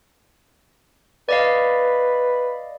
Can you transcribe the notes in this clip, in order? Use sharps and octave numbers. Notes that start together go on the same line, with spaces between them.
B4 D5 D#5 F5